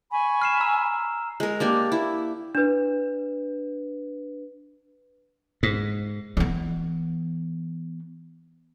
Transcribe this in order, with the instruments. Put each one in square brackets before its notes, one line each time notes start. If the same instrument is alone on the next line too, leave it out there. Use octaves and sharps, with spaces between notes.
[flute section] G#5 B5 C#6
[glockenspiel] F6 C7 E7
A#5 E6
[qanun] G#3 A#4
A#3 D4 G4
E4
[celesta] D4 B4
[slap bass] G#2
[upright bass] E3 B3